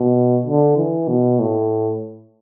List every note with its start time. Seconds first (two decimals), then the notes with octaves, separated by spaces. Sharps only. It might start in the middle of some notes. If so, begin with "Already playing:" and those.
Already playing: B2
0.46 D3
0.77 E3
1.08 B2
1.39 A2